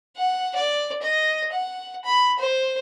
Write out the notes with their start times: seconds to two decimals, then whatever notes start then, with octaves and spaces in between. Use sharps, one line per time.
0.17 F#5
0.55 D5
1.02 D#5
1.52 F#5
2.05 B5
2.39 C5